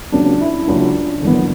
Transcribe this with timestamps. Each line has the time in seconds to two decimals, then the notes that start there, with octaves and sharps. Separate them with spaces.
0.12 C#2 C#3 F#3 A#3 D4
0.41 E4
0.67 C#2 C#3 F#3 A#3 D4
1.22 G1 F#2 E3 B3